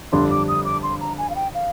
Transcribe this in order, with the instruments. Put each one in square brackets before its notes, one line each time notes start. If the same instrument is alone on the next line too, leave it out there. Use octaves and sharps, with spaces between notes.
[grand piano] G1 F2 D3 G3 D4 [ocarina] C6
[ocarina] D6
D#6
D6
C6
A#5
G#5
F5
G5
F5